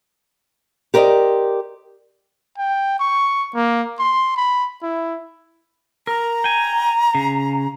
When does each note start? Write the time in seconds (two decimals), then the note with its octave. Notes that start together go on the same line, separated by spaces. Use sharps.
0.94 G4 A#4 C5 D5 D#5
2.58 G5
3.00 C#6
3.55 A#3
3.99 C6
4.36 B5
4.83 E4
6.07 A#4 A#5
6.44 G5 G#5
7.15 C#3